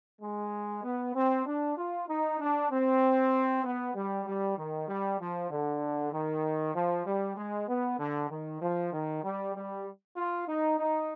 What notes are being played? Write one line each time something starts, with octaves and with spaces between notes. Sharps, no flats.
G#3
B3
C4
D4
F4
D#4
D4
C4
B3
G3
G3
D#3
G3
F3
D3
D#3
F3
G3
G#3
B3
D3
D#3
F3
D#3
G3
G3
F4
D#4
D#4